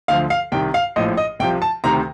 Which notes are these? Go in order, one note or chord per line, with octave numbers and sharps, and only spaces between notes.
D2 D3 F3 F5
F5
C2 C3 D#3 G5
F5
A#1 A2 F3 D#5
D#5
C2 C3 F3 G5
A5
D2 C3 D#3 A#5